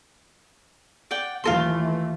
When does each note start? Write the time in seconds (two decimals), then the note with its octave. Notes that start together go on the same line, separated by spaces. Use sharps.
1.11 D5 F#5 G5
1.44 D#2 E3 A3 F4 A4 C6